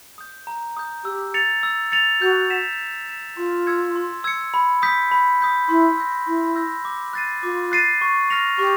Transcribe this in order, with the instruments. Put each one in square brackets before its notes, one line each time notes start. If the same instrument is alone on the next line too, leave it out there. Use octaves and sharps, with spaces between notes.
[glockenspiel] D#6 G6
A#5
D#6 G6
[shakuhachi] G4 [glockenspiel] E6
[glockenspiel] A6 C#7 F7
E6
A6 C#7 F7
[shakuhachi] F#4 [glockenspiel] G6
[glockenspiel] B6 E7
G6
B6 E7
[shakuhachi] F4 [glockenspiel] C6
[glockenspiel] E6 G#6 C#7
C6
E6 G#6 C#7
B5
D#6 G6 B6
B5
D#6 G6 B6
[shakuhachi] E4 [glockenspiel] C6
[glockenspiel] E6 G6 A#6
[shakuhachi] E4 [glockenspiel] C6
[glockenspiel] E6 G6 A#6
D6
F#6 A6 C7 D#7
[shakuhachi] F4 [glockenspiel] D6
[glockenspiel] F#6 A6 C7 D#7
C#6
F6 A#6 C#7 F7
[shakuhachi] G4 [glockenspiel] C#6